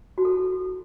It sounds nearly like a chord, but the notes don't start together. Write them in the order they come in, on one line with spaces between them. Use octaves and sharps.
F#4 E4 A4